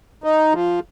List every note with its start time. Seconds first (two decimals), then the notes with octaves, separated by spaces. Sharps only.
0.24 D#4
0.53 F3